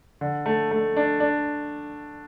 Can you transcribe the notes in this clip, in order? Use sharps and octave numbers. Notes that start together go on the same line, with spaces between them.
D3
A3
A3
D4
D4